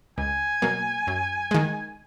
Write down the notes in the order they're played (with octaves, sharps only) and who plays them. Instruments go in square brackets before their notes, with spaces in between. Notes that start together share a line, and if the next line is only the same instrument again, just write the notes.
[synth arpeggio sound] C#2 [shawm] G#5
[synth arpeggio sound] B2 F#3 A#3
F#2
D#3 G#3